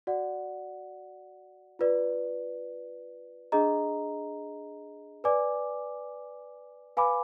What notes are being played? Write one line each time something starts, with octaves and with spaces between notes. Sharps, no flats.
F#4 D5 F#5
F4 B4 D5
D4 G#4 D#5 A#5
B4 D5 G#5 D6
B4 F5 G#5 B5 D6